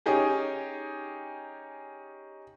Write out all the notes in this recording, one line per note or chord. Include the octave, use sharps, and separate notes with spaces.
C#4 D#4 G4 G#4